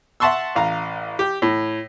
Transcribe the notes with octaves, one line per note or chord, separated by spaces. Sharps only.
E5 F#5 A5 C6 C#6 E6
A1 F5 A#5
G4
A2